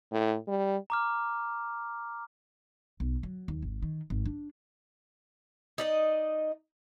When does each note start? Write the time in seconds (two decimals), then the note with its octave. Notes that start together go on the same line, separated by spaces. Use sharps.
0.12 A2
0.48 G3
0.90 A#5 D6 F6
3.00 B1
3.23 F#3
3.48 D#2
3.62 G#1
3.83 D#3
4.10 G#1
4.26 D4
5.78 D#4 D5 D#5